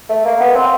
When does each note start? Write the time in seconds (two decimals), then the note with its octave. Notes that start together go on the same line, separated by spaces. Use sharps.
0.09 A3
0.25 A#3
0.40 B3
0.55 C4